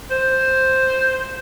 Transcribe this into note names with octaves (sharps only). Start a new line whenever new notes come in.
C5